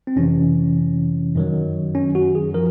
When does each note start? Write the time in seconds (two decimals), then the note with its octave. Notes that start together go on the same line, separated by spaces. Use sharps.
0.07 C4
0.16 F2 C3 E3 C#4
1.35 F#2 D#3 F#3
1.95 C#4
2.15 F#4
2.35 G#4
2.54 F3 A#4